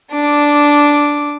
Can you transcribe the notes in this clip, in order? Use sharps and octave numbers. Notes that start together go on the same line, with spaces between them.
D4 D6